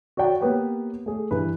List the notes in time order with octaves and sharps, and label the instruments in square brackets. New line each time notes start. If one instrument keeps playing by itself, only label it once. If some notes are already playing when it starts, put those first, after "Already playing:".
[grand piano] F#4 C#5 D5 G5
A#3 B3 G4 B4 C#5 G5
A3 G#4
G2 E3 B4